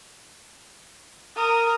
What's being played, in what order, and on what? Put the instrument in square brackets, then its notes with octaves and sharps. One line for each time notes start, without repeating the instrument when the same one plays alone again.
[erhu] A#4 [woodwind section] D#6